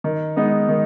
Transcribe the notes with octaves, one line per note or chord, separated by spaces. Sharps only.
D#3
G#3 B3 D#4
D#3